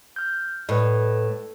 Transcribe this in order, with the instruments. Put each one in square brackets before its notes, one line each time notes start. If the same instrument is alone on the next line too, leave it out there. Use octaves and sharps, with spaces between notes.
[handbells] F6 G6
[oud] A2 [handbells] B4 D#5